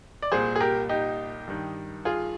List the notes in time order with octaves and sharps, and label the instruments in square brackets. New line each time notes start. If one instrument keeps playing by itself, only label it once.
[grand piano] D5
C2 A#2 G#4 C5
G#4
G4 A#4
D#4 G4
G2 D#3
F4 G#4